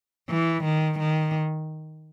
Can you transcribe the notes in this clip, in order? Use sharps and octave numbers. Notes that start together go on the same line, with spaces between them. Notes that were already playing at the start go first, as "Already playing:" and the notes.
E3
D#3
D#3